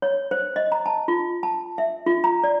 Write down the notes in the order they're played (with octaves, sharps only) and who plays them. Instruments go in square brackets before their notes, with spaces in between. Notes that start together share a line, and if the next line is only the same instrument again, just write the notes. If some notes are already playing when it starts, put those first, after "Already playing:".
[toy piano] C#5
C5
D#5
A#5
A5
F4
A5
E5
F4
A#5
D5